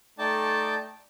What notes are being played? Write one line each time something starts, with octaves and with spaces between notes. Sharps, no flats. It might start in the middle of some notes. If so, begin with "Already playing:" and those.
A3 D#4 D5 G5 A5